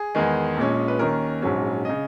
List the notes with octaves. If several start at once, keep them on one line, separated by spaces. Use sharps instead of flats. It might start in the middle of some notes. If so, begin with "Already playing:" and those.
Already playing: G#4
E2 D#3 G#3
A#1 A#2 G#3 C#4
B4
D#2 D#3 A#3 C#4 A#4
A#1 G#2 F#3 C#4
C#3 D#5